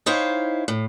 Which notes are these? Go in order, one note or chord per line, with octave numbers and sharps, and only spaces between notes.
D#4 E4 C5 C#5 F5 G5
A2